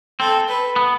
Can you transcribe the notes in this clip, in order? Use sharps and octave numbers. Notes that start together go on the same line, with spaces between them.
C4 A4
B4
B3